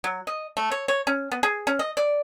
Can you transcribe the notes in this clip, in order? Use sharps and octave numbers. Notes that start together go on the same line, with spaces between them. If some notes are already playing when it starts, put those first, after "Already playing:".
F#3
D#5
A3
C#5
C#5
C#4
B3
G#4
C#4
D#5
D5